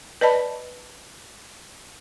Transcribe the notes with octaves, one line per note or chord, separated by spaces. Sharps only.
B4 D5 D#5 A5 B5